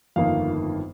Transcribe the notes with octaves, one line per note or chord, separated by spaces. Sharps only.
G1 F2 D#3 A#3 D#4 F5